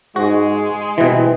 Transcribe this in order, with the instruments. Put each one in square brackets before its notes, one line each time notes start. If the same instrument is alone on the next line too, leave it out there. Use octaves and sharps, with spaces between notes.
[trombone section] G#2 [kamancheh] G#3 [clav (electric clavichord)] F#4
[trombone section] C2 C4 E4 [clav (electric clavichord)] B2 E3